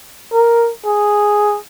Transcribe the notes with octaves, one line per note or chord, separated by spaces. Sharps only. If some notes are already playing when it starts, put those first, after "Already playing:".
A#4
G#4